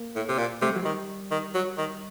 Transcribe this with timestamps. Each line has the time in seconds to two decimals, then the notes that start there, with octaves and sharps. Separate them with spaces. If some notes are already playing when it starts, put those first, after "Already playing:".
Already playing: A#3
0.16 A2
0.29 C3
0.38 A#2
0.62 C3 A3
0.69 G3
0.76 F#3
0.83 D#3 G3
1.31 D#3
1.55 F#3
1.78 D#3